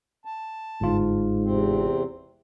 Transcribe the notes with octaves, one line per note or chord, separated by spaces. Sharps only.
A5
G1 G#2 F4
E2 C3 C4